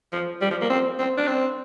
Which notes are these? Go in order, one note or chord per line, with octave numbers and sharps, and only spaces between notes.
F3
G3
F3
A#3
C4
C4
D4
C4